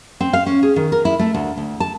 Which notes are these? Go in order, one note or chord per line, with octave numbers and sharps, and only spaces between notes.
C4
F5
C#4
G#4
D#3
A#4
E4
A3
D2
D2
A5